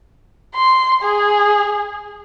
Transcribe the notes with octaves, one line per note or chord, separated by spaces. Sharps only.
C6
G#4